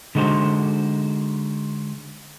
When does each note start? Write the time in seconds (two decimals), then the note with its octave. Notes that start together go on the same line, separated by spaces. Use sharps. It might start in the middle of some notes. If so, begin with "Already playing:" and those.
0.15 D3 G#3 D#4 F#4 C5